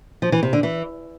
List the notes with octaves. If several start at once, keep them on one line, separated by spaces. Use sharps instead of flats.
F3
E3
C3
D3
E3